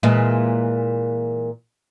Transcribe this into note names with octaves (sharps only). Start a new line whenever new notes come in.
A#2 E3 G#3